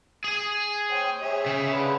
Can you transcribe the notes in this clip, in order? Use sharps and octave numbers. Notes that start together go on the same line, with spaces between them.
G#4 G#5
C5 C#5 G5
G#4 C#5 E5
C#3
D3 G#4 B4